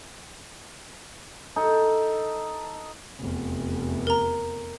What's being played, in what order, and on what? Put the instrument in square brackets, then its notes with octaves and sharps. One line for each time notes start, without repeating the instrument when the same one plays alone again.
[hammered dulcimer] D#4 A4
[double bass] F1 E2
[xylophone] A#4 A#5